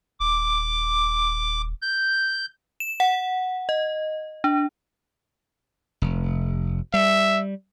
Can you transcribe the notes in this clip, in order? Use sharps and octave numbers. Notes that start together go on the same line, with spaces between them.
D#1 D6
G6
E7
F#5
D#5
D4
F1
G3 E5